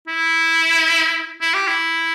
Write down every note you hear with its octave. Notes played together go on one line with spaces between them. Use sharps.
E4
E4
G4
E4